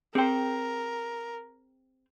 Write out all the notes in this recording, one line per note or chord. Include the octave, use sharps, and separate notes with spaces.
C4 G#4 A#4 C5 G5